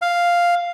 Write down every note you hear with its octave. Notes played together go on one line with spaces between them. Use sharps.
F5